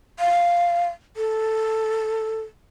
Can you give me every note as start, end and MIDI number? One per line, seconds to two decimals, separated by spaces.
0.19 0.87 77
1.17 2.40 69